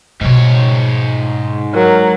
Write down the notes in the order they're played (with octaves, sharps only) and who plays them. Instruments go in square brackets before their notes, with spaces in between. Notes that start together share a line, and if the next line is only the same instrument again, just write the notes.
[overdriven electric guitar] G#2 C#5 [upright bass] B2 G3
[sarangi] F#3 [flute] A#4